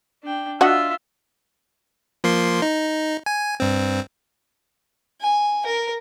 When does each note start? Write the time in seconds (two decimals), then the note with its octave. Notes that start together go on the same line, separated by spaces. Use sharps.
0.24 D4 G5
0.61 D4 F4 F#4 D#5 E5 F#5
2.24 F3 A#3 C6
2.62 D#4
3.26 G#5
3.60 G2 C4
5.21 G#5
5.66 A#4